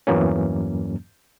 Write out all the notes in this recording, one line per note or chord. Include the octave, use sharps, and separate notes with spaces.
E2 G2 E3 F#3 A#3 C#4